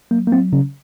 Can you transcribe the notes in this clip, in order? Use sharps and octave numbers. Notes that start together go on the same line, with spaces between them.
F#3 A#3
A#3
F#3 C4
C#3 C#4